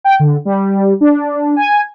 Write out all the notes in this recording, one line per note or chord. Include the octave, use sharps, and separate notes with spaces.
G5
D3
G3
D4
G#5